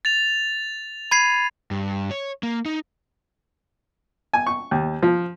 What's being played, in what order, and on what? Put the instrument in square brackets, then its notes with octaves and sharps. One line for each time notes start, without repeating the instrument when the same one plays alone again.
[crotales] A6 F7
[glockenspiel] B5 G#6 C7 [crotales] D#7
[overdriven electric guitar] G2
C#5
A#3
D#4
[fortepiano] G#5
C#6
D#2
F3